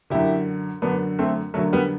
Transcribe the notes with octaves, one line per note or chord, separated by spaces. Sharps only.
F#2 D3 E4 G4
F#2 D3 B3 D4
A3 C4
F#2 D3 F#3 A3
G3 B3